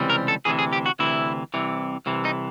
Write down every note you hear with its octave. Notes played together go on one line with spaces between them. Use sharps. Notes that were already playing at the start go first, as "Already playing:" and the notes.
Already playing: C#2 C3 E3 G3 C4
A#4
A4
D2 C3 E3 G#4
G#4
G4
F#4
D2 C3 E3 E4
C2 C3 E3
C2 C3 E3
D#4